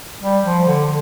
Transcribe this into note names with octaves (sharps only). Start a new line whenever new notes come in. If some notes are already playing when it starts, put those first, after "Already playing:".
G3
F3
D3